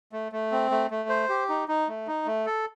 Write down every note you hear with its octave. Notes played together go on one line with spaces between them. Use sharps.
A3
A3
C4
A3
A3
C5
G4
D#4
D#4
A3
D#4
A3
A4